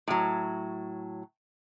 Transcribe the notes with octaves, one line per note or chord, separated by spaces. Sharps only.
A2 F#3